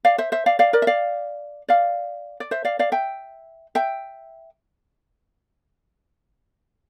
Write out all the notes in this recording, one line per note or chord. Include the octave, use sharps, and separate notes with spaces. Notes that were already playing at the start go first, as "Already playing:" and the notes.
D5 F5
C5 E5
C5 E5
D5 F5
D5 F5
A#4 D5
E5
D5 F5
D5 F5
D5
C5 E5
D5 F5
D5 F5
E5 G5
E5 G5